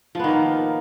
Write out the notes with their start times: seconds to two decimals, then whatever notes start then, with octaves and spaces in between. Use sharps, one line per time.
0.15 F3
0.19 B3
0.24 D#3
0.28 A#3